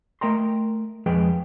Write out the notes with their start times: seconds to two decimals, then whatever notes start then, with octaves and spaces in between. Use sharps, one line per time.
0.21 A3 A#4 D#5 G5 A#5 C6
1.06 F2 F3 G#3 G#4 B4 G5